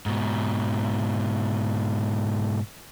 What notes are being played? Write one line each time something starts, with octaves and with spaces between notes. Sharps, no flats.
G#2 B2